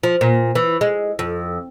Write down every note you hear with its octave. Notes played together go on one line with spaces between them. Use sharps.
F3
A#2
E3
G#3
F2